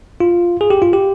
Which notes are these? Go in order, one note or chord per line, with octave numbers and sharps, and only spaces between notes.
F4
G#4
G4
F4
G4